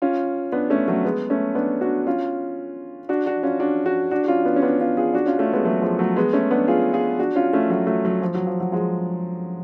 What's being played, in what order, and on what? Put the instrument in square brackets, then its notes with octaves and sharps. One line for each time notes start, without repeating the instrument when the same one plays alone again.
[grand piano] C#4 F4
B3 D4
A3 C#4
F#3 A3
G#3 B3
A3 C#4
B3 D4
D4 F#4
C#4 F4
D4 F#4
D4 F#4
C#4 F4
D4 F#4
D4 F#4
D4 F#4
F#4
C#4 F4
B3 D4
C#4
B3 D4
C#4 F4
F4 G#4
D4 F#4
C#4 F4
A3 C#4
G#3 B3
F#3 A3
F3 G#3
F#3 A3
G#3 B3
A3 C#4
B3 D4
F4 G#4
F4 G#4
D4 F#4
C#4 F4
A3 C#4
F#3 A3
F#3 A3
F#3
F3
F#3
F3
F#3
F3 G#3